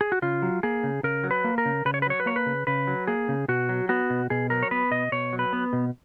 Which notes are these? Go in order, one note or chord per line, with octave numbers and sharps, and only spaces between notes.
G#4
F#4
C#3 F4
F#3
A#3 G#4
C#3
C#3 A#4
F#3
B4
A#3
A#4
C#3
C#3 B4
C#5
B4
F#3 C#5
B4
A#3 C#5
B4
C#3
C#3 B4
F#3
A#3 G#4
C#3
B2 F#4
F#3
B3 F#4
B2
B2 G#4
F#3 A#4
C#5
B3 B4
B2 D#5
B2 C#5
F#3
B4
B3
B2